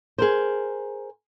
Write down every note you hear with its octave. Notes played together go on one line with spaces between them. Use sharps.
G#4 A#4 C5